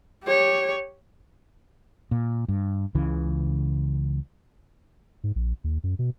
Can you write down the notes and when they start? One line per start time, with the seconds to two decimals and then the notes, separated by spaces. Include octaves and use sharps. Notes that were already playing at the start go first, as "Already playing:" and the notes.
0.24 G4 C#5
2.11 A#2
2.48 G2
2.95 C#2 C#3 E3
5.24 G#2
5.36 A#1
5.64 D#2
5.84 F#2
5.99 B2